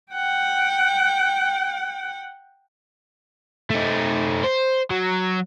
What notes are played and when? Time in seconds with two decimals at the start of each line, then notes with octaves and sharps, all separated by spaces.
0.13 F#5 G5
3.70 A3 D#4
4.44 C5
4.90 F#3